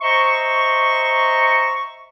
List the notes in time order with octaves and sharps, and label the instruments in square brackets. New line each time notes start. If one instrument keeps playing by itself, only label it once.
[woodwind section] C5 D#5 E5 A#5 C6 C#6